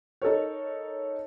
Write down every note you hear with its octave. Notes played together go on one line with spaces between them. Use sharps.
D#4 A4 A#4 C#5